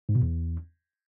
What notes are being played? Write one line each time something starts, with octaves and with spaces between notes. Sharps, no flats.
G#2
B2
E2